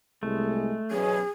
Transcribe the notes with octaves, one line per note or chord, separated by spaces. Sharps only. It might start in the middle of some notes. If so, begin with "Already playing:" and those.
C2 G#3 A3
E2 B2 F#3 C#4 G#4